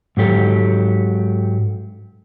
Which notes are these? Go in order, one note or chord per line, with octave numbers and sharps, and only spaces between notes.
G#2 F#3 G4 A4